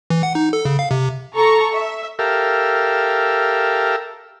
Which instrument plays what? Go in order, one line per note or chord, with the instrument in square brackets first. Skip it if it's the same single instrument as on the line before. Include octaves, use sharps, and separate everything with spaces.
[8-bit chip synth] E3
F#5
D#4
A4
C#3
F5
C3
[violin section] A4 A#5 C#6
E5
[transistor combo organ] G4 A4 A#4 E5 F5